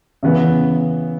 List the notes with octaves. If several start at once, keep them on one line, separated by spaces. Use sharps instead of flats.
C#3 E3 B3